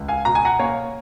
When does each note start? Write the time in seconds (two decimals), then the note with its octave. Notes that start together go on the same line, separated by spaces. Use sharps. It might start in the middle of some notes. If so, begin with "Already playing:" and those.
Already playing: C#2
0.08 F5 G#5
0.25 B2 A#5
0.35 G#5
0.45 F#5 A#5
0.59 A#3 C#5 F5